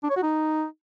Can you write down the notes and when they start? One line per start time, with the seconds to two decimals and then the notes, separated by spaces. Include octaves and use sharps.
0.03 D4
0.10 C#5
0.16 F#4
0.23 D#4